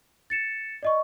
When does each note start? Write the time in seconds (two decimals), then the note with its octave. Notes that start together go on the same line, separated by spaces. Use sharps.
0.30 A6 C#7 E7
0.83 D5 D#5 C#6